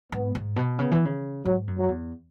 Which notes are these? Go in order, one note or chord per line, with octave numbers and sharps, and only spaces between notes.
G#2 B3
G#2
B2
C#3 B3
E3
C#3
G#2 F#3
F#2
F#3
E2